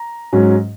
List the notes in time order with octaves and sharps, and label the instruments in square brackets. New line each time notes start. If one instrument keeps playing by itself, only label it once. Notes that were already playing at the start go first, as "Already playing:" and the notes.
Already playing: [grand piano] A#5
G#2 F#3 C#4